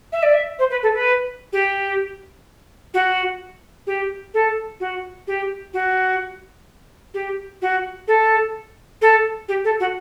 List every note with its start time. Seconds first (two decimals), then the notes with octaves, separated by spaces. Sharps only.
0.12 E5
0.22 D5
0.33 E5
0.58 C5
0.70 B4
0.82 A4
0.93 B4
1.52 G4
2.93 F#4
3.86 G4
4.33 A4
4.79 F#4
5.27 G4
5.73 F#4
7.13 G4
7.61 F#4
8.07 A4
9.01 A4
9.48 G4
9.64 A4
9.79 F#4